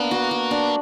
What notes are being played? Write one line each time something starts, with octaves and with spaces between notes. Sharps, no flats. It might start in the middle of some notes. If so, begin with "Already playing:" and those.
Already playing: A#3 B3 D4
F#4
F#4
D4